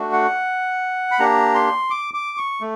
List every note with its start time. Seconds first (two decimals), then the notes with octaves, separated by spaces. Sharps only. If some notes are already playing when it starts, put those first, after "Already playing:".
Already playing: A3 D4 F#4
0.13 F#5
1.11 B5
1.19 A#3 D4 G4 A#5
1.55 C6
1.90 D6
2.14 D6
2.38 C#6
2.61 A3